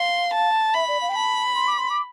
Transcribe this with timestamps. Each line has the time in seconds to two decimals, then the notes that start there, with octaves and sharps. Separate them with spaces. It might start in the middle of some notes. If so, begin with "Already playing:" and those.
Already playing: F5 C6
0.34 A5
0.74 E5 B5
0.88 D5
1.01 F5
1.09 G5
1.15 A5 B5
1.55 C6
1.67 D6
1.78 C6
1.90 D6